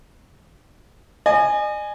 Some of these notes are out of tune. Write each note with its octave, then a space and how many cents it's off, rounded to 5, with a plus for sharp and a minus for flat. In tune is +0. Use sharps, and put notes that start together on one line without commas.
D#5 -40 G#5 +0